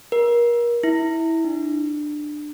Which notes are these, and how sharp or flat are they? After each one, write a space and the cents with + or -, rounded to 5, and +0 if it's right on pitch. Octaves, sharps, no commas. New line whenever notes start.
A#4 +30
E4 -15
D4 +20